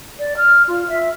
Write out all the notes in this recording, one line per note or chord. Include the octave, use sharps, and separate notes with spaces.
D5
F6
F4
E5